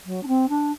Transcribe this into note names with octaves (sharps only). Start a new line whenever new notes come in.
F#3
D4
C4
D4